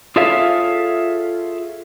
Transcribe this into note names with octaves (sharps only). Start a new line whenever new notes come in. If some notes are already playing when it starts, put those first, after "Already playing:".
F4 G#4 A4 C#5 E5 F5